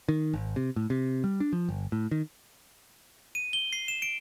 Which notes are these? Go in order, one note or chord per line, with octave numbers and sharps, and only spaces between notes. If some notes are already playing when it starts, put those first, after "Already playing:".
D#3
G#1
C3
A2
C3
G3
D4
F3
G1
A2
D#3
D#7
G7
C7
E7
D7